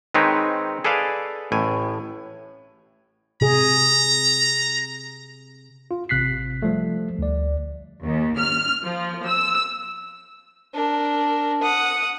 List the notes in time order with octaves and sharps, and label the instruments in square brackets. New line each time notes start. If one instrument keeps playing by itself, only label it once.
[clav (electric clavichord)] D#3 G#3 C4 D#4 B4 C#5
G#4 A4 B4 D5 F5 G#5
A1 A2 G#5
[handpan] C3 G#4 [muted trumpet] A#5
[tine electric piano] F4
A1 C3 F#6 B6 C7
F3 G3 A3
D2 D5
[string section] D#2
F6
F3
E6
[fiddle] D4 A#4
F#5 D#6